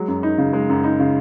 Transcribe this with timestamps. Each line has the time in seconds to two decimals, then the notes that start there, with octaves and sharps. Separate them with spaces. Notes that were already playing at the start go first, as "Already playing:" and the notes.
Already playing: F#3 G#3
0.08 F#2
0.23 D#4
0.38 C#3
0.53 G#3
0.70 F#2
0.84 D#4
1.00 C#3